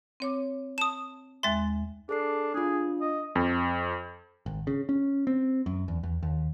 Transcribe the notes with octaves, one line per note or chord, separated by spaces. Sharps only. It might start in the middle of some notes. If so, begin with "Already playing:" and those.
C4 C#5 D6
A5 D#6 E7
D#2 G#3 E5 C6 A6
D4 G#4 A4 C7
D4 F4 G#4
D#5
F2
G#1
C#3
C#4
C4
F#2
E2
E2
D#2